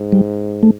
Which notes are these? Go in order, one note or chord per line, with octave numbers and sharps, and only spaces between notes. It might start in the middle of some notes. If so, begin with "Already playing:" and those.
Already playing: G#2
G3
A3